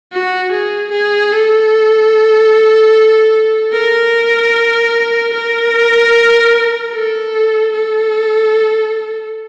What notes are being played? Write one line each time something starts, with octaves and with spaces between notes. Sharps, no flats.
F#4
G#4
G#4
A4
A#4
A#4
A4
A4